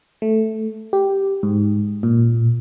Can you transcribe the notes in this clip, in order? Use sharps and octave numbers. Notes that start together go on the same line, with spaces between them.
A3
G4
G#2
A#2